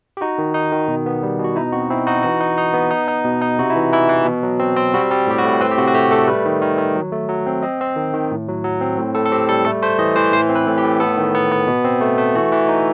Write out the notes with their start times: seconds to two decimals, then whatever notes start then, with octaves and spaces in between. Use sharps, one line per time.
0.17 G4
0.21 D#4 F#4
0.38 D#3
0.54 D#4
0.72 D#3
0.88 B2
1.06 B3
1.23 G3
1.39 B2
1.44 F#4
1.56 D#4 E4
1.72 C4 F#4
1.90 C4 E4
2.07 D#4 F#4
2.23 E3 F#4
2.41 D#4
2.58 D#4
2.74 B3
2.90 D#4
3.08 D#4
3.25 B2
3.41 D#4
3.59 C3 F#4
3.70 E4
3.76 E3
3.92 E3 E4
4.09 E3
4.25 B2
4.43 F#3
4.60 C4
4.76 C4
4.94 G3 F#4
5.11 G3
5.27 A2 G4
5.38 F#4
5.44 A2
5.61 C4 B4
5.71 G4
5.77 C3 F#4
5.88 F#4
5.94 A3 G4
6.11 A3 A4
6.28 G3 B4
6.45 D#3
6.61 D#3
6.78 D#3
6.95 F#3
7.12 A3
7.29 F#3
7.46 C4
7.63 C4 D#5
7.81 C4
7.96 D#3
8.13 D#3
8.31 A2
8.48 F#3
8.64 F#3
8.81 C4
8.98 A2
9.15 A2 A4
9.26 A4
9.32 C4 G4
9.49 G3 A4
9.65 A3 A4
9.83 A3 C5
9.99 E3 D#5
10.16 E3 C5
10.33 A2 C5
10.49 C4
10.55 B4
10.67 A2
10.78 G4
10.84 A2
11.00 B3 A4
11.17 D#3
11.35 B3
11.52 B3
11.67 B2
11.84 C4
12.01 A3
12.18 A3
12.35 E3 F#4
12.52 E3
12.68 D#4